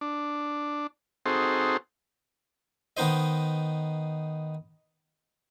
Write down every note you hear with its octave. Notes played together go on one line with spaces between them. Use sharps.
D4
C4 D#4 F#4 G#4 A4 C5
D#3 B3 D#4 C5 D#5